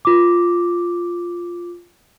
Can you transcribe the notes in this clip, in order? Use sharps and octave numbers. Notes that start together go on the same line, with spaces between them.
F4 D6